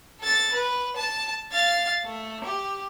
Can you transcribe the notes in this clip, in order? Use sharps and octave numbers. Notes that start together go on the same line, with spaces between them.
A4 A6
B4
A5
F5 A6
A3
G4